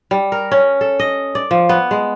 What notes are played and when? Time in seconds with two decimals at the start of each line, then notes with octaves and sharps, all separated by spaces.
0.11 G3
0.32 A#4
0.51 C#4
0.81 A4
0.99 D#5
1.35 D5
1.51 F3
1.69 B3
1.91 G#3